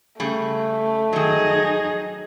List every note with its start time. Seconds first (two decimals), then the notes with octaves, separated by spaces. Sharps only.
0.20 C#3 G3 A3 G#4
1.13 D#3 F#3 D#4 G#4